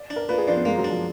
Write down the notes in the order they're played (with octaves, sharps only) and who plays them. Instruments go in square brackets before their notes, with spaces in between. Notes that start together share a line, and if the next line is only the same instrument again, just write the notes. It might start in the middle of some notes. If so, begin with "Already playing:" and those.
Already playing: [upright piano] D5
[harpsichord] D4
[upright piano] A#4
[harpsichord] A#2 [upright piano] B4
[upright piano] G#4
[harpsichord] F3 [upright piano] D4
[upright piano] B3
[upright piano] G#3 [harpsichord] A#3
[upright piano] F#3
[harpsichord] D4
[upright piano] F3